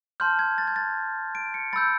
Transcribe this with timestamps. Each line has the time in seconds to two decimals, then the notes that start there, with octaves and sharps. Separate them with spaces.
0.20 A5 C6 F6 G6
0.39 G#6
0.58 A6
0.67 G#6
0.76 A6
1.35 D7
1.54 C#7
1.73 B5 E6 G6 A6